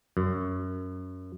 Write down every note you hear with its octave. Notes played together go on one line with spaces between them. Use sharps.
F#2